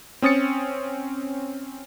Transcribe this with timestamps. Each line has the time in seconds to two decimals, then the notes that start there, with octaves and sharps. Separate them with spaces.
0.22 C4 C#4 D#6 A6 C#7